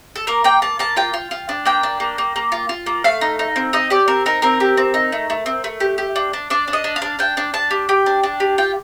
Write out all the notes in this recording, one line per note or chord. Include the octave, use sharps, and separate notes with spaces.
A4
A#3 A#4
A#3 G5
A#3 A5
A#3 A5
F4 G5
F4
F4
D4
A#3 G5
D4
A#3
A#3
A#3
F4
F4
A#3
A3 F5
D#4
D#4
C4
D#4 D#5
G4 D5
C4 A#4
D#4 A#4
C4 A#4
G4
C4
D#4
A3
A3
C4
A3
G4
G4
D4
D4
D4 D5
D4
D#5
D4
F5
D4
D4 G5
D4
D4 A5
G4
G4 G5
D4
D4
G4
F4 G5